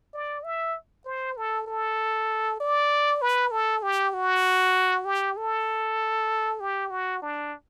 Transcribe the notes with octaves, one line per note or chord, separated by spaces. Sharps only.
D5
E5
C5
A4
A4
D5
B4
A4
G4
F#4
G4
A4
G4
F#4
D4